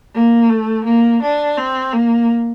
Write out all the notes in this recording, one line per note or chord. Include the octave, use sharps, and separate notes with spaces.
A#3
A3
A#3
D4
C4
A#3